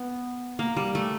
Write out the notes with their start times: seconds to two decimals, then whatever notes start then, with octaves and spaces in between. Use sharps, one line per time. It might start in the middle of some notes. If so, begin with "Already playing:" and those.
Already playing: B3
0.59 A#3
0.76 G3
0.95 A3